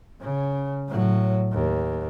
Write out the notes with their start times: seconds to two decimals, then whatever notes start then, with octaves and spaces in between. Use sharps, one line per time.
0.21 C#3
0.88 A2 F#3
1.52 D#2